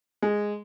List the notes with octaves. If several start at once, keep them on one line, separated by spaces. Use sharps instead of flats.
G#3